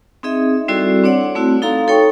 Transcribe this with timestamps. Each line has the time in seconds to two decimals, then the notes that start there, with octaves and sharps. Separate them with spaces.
0.23 C4 D#4 G#4 D#5 E5
0.68 G3 C4 E4 F#4 A4 D5
1.04 C4 D4 C#5 D5 F#5
1.35 A3 C4 E4 F#4
1.62 D#4 A4 F5 A#5 C6
1.87 D#4 A4 C#5 G5 C#6